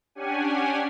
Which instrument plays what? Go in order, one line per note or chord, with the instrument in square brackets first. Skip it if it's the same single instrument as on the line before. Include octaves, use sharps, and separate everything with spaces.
[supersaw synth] C#4 D4 G4 F#5 G#5